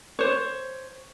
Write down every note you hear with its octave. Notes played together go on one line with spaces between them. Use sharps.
C5 C#5